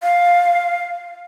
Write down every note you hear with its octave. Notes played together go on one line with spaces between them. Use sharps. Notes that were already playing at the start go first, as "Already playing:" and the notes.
F5